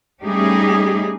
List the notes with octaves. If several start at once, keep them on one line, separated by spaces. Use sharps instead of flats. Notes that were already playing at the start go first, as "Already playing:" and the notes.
G3 A3 C#4 D#4 G4 G#4